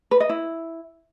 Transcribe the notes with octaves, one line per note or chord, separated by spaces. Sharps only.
B4
D#5
E4